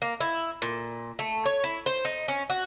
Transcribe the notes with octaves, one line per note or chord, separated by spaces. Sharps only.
A#3
E4
A#2
A3
C#5
E4
C5
D#4
C#4
F#4